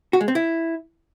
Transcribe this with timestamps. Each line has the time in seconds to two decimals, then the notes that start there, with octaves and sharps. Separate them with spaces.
0.13 F#4
0.21 G#3
0.28 C4
0.35 E4